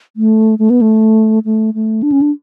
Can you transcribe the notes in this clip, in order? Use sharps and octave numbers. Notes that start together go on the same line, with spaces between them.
A3
A3
B3
A3
A3
A3
D4
C#4
D4